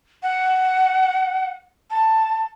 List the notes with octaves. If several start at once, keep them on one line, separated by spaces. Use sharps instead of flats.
F#5
A5